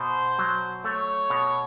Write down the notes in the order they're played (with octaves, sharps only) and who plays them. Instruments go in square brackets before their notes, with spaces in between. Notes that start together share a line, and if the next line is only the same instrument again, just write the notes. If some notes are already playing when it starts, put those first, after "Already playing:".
Already playing: [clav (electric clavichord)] B2 [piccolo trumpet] C5
[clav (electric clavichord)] F#3
[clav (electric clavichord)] A3 [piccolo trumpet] C#5
[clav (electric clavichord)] B2